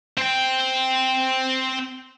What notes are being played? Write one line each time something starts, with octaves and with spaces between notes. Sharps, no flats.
C4 G5